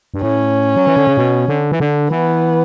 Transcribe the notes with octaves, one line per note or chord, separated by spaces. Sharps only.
G2
A2 C#4
F#3
E3
D3
C#3
B2
D3
E3
D3
E3 B3